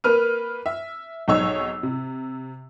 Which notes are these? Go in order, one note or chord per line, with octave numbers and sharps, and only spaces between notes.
A#3 B4 F6 D#7
E5
B1 G#2 D#4 C#5 C#6 E6
C3